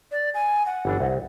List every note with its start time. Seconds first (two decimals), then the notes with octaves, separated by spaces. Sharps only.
0.12 D5
0.34 G#5
0.66 F#5
0.85 G1 E3 D4
1.00 C2